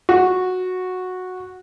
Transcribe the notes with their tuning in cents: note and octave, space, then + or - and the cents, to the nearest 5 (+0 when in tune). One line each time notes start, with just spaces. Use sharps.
F#4 -10